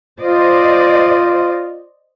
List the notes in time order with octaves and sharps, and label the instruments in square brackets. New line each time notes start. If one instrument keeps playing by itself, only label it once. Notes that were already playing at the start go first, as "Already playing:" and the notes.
[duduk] F4 [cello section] C5 D5 D#5